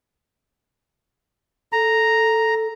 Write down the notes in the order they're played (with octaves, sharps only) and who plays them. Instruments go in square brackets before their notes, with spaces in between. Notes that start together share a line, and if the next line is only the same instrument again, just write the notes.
[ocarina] A4 [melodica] A#5